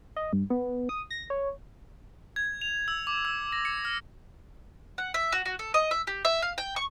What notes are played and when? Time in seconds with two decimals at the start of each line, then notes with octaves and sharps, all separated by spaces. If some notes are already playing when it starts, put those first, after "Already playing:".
0.16 D#5
0.33 G2
0.50 B3
0.89 D#6
1.11 A#6
1.30 C#5
2.36 G#6
2.61 F7
2.88 E6
3.07 D6
3.25 E6
3.52 A#6
3.65 C#7
3.85 F6
4.98 F#5
5.14 E5
5.32 F#4
5.46 F#4
5.59 A4
5.74 D#5
5.91 E5
6.07 G4
6.25 E5
6.42 F5
6.58 G5
6.76 C#6